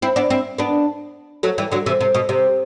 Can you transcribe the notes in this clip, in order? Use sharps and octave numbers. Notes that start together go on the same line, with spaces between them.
C4 E4
B3 D4
C4 E4
B3 D4
F#3 A3
E3 G3
D3 F#3
C3 E3
C3
B2
C3